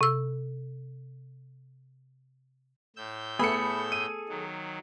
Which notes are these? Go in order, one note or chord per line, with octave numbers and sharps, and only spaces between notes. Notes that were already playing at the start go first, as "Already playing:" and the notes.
C3 E6
A2 E6 G6
A3 B3 G#4 A4 B5 C#7
D#7
D#3 F#3